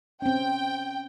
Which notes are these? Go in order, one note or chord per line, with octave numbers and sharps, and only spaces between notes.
C4 C#4 G5